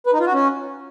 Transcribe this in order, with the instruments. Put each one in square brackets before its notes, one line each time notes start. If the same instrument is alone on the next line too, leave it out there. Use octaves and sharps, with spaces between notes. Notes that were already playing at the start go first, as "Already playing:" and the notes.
[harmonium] B4
D#4
F4
F#4
C#4